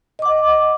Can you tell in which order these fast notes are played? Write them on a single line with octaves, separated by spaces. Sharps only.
D#5 D6 F#5